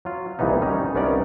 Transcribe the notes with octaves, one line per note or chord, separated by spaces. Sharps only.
F#3 F4
C2 A#2 E3 B3 D#4
D#3 G3 C#4 D#4
C2 B3 C#4 D#4 A#4 D5